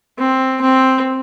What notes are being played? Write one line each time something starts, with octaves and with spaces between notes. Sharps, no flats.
C4
C4